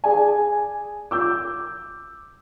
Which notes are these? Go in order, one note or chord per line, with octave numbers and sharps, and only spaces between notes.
G#4 D5 G#5
D6 E6 G6